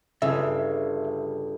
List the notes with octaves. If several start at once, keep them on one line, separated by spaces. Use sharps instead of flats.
G1 C#3 E5